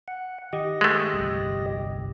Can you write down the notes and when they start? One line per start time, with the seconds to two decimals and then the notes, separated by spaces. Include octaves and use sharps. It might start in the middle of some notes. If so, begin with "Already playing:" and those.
0.08 F#5
0.53 D#3 G4 D#5
0.81 G#3 A3
1.13 G1 C2 F2